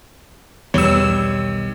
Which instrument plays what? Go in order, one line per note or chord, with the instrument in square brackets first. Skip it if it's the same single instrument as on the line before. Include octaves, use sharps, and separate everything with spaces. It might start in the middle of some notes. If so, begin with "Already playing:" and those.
[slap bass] B1 D#3 [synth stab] E2 E6 [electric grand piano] G3 C#5